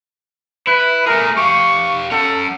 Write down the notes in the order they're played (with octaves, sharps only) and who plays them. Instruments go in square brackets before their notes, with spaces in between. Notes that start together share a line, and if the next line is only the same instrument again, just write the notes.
[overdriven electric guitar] E4 [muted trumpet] B4
[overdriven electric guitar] A3 G#4 [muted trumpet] A#4
[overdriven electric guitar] G4 F5 [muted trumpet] C#6
[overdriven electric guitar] C#4 F#5 [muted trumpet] A4